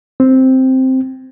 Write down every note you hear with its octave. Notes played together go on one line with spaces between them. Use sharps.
C4